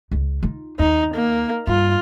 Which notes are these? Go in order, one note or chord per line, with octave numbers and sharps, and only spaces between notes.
C#2
D#4 F4
D#2 D#4
A#3
G2 F4